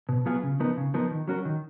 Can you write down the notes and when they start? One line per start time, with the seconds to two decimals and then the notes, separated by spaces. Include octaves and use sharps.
0.09 B2
0.26 F#3 B3 F4 G#4
0.43 C#3
0.60 F3 B3 D#4 A#4
0.77 C#3
0.94 F3 B3 D#4 A#4
1.11 D#3
1.28 F#3 C#4 F#4 A#4
1.45 D#3